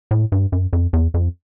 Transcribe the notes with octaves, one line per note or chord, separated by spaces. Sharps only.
A2
G2
F#2
F2
E2
F2